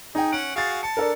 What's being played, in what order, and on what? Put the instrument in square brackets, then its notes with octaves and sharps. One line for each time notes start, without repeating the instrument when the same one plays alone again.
[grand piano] D#4 G5 [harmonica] G#4
[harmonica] C#4 F#5 [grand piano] D7
[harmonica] F#4 G#4 F5 [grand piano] A6 C7
[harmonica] A5 [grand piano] C#7
[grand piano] D4 A4 A#4